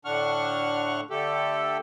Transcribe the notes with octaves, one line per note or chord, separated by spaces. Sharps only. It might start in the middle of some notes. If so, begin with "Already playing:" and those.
A2 D3 D4 F#5 C#6 F6
D3 A3 G4 A4